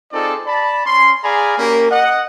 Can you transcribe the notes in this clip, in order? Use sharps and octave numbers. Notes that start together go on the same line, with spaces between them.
C4 D#4 F4 G#4 A4 D5
D5 A5 B5
C#4 C6
G#4 D5 F5 G#5 A#5 B5
A#3 C#4 G4 A#4
D#5 F#5